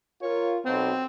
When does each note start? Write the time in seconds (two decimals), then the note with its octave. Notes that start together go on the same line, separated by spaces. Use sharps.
0.22 F4 A#4 C#5
0.65 B1 C4